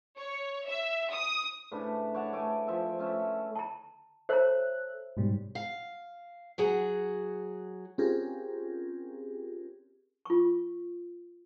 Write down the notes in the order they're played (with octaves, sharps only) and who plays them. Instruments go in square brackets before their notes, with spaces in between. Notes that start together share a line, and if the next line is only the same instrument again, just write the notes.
[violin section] C#5
E5
D#6
[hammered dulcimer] A2 C#3 D4 B4
C#5 D5 F#5 A5
A3 G#5 D6
F3 E5 G#5
A3 C#4 E5
[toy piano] A5 A#5
[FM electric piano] A4 E5 F#6 [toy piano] C5 C#5 A#5
[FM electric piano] G#2 B2 G3
[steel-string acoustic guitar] F5
F#3 F#4 G#4
[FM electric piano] C4 C#4 F4 G4 G#4 A#4
[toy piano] F4 C#6